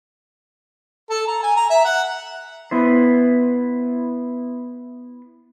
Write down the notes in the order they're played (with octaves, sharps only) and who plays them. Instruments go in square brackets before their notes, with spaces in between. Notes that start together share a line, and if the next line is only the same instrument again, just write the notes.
[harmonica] A4
A#5
G#5
A#5
E5
F#5
[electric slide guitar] B3 E4 C5